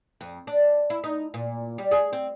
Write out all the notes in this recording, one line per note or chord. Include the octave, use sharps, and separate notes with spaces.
F2
D4
E4
D#4
A#2
G3
G#4
C4